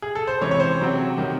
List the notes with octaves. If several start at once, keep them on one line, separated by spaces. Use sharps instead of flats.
G#4
A4
C5
C3 E3 G#3 C#4 C#5
C#5
C5
C3 F#3 C4
C3 D#3